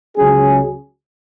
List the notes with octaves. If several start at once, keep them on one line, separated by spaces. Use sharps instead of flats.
C#2 C#3 F#3 C#4 G#4